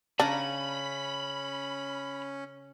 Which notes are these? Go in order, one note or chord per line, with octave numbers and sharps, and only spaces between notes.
C#3 C#4 D4 A#5 B5